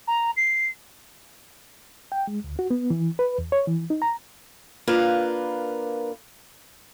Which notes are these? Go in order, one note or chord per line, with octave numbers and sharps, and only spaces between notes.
A#5
C7
G5
G#3
D2
F#4
B3
E3
B4
E2
C#5
E3
D#4
A#5
A#3 D4 F4 A#4 B4